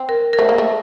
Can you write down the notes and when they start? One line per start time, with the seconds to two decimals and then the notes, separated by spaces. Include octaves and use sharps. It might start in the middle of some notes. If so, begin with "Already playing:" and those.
Already playing: C4
0.09 A#4
0.33 A#4
0.38 A3 C5
0.49 A#3
0.58 A3